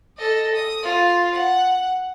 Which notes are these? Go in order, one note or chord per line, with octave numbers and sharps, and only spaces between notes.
A4 D#5
D#6
F4
F#5